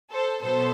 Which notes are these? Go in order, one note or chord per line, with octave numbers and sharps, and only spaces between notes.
A4 C5
B2 F#3 B3 A4 C5